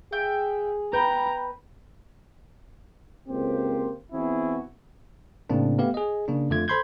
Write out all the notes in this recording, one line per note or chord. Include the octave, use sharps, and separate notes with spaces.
G#4 E5 G5
B4 G5 A#5 G6
C#2 A#3 C4 G4 C5
E3 B3 C4 E4 F#4 G#4
A2 C#3 A#3 C4 D4
A3 B3 G4 B4 F5
G#4 D#5
C#3 A#3 D4
F2 D3 A3 F4 G#6
A4 C5 B5 C6 G6 G#6